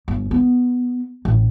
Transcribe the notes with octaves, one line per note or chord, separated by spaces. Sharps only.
G1
B3
A1